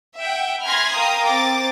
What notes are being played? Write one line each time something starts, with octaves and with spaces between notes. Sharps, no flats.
E5 F#5 G5
G#5 B5 C6 F6 G#6 A#6
A#4 F5 G5 A#5 D#6
C4 D6 A6